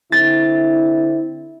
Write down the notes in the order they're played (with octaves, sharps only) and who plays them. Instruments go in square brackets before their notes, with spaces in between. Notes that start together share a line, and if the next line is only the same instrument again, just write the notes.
[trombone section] D3 C4 E4 [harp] A6